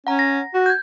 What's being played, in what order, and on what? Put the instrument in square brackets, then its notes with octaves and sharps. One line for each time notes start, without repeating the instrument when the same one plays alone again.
[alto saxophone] C#4 [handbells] F#5 A#5
[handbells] A#6
[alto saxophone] F#4
[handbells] G6 G#6